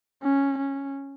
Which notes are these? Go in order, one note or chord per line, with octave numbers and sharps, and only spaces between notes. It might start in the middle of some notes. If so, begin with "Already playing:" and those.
C#4
C#4